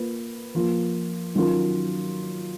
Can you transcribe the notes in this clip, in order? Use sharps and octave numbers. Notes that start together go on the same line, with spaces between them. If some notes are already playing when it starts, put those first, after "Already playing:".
Already playing: A#3 F4 B4
F3 A#3 F4
D#3 F#3 C#4 F4 A#4